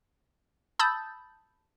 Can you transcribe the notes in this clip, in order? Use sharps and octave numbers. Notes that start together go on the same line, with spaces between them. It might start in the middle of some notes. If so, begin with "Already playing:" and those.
A5 B5 D#6 E6 G6 A6